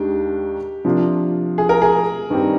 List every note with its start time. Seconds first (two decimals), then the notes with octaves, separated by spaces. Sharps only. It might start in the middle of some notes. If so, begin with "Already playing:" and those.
Already playing: D#2 D#3 G#3 D4 G4
0.85 C3 F3 A#3 D4 F4
1.58 G#4
1.69 A#4
1.82 G#4
2.30 G2 D#3 G3 C4